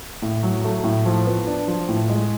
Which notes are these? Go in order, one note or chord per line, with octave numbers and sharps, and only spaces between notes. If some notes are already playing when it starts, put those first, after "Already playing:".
A2
F#3
A3
A2
F3
B3
D4
F3
A2
G#3